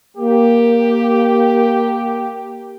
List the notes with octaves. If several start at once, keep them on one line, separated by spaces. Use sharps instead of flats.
A#3 G4